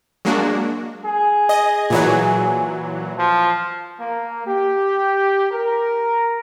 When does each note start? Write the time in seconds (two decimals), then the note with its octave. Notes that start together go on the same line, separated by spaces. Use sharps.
0.25 F#3 G#3 A#3 D4 F#4
1.05 G#4
1.49 D#5
1.90 A#2 E3 F#3
3.18 F3
4.00 A#3
4.46 G4
5.52 A#4